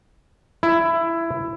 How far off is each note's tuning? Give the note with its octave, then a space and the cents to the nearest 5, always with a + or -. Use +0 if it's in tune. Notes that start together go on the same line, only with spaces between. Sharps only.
E4 +15